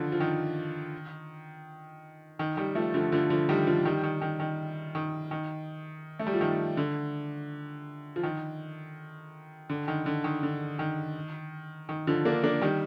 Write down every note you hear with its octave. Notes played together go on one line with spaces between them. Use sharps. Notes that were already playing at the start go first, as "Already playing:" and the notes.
Already playing: D3 D#3 F3
F3
D#3
D#3
D#3 G3
F3 A3
D3 F3
D3 F3
D3 F3
D#3 G3
D3 F3
D#3 G3
D#3
D#3
D#3
D#3
D#3
A3
G3
F3
D#3
D3
F3
D#3
D3
D#3
D3
D#3
D3
D#3
D#3
D3 F3
A#3 D4
A#3 D4
D#3 G3